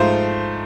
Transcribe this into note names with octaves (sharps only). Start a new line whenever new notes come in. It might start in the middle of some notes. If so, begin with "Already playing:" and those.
Already playing: G#2 F3 A3 C5 F5